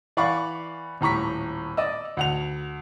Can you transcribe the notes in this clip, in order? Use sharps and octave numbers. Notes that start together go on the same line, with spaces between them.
E3 D5 F5 F#5 B5 C#6
D#1 A2 A#5 C#6 B6
D5 D#5 E6
D2 F#5 F7